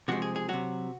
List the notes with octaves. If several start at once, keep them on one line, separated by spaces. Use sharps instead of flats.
C3 F3 G#3 F#4
G#4
G#4
C3 F#3 F#4